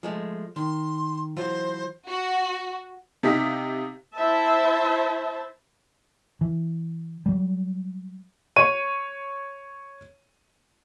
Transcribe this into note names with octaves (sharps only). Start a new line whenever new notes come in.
F3 G#3 A3
D#3 C6
E3 F#3 F4 C5
F#4
C3 D#4 G4 F5 B6
E4 C5 E5 A5
E3
F#3 G3
C#5 D#7